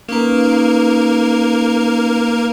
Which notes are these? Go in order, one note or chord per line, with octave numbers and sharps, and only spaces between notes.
A#3 C#4 D#4 A#4 B4